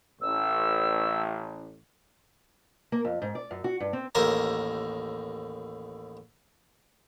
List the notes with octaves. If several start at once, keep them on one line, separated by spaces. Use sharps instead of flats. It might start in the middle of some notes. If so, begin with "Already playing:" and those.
A1 E6
A#3
F2
G#2
D5
F#2
F#4
G2
C4
A1 D#2 A#4 C5 G#5 A#5